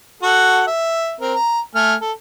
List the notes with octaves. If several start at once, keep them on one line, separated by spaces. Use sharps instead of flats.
F#4 A4 F#5
E5
C4 A#4
A#5
A3 G#5 F6
A4